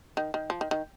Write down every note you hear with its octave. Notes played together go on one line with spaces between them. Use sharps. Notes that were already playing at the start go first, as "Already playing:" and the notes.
D#3
D#3
F3
D#3
D#3